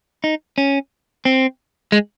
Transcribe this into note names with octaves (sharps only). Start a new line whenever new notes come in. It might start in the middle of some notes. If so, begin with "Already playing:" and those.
D#4
C#4
C4
G#3